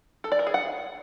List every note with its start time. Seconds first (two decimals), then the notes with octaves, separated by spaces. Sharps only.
0.24 A4
0.32 D5
0.39 A#4
0.47 G#4
0.54 F#5